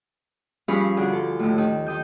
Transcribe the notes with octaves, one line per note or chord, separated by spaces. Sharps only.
G2 F3 C#4 G#4 C#5 B5
D2 D3 G#4
A4
D#2 A2
D#3
D#3 D#6 G6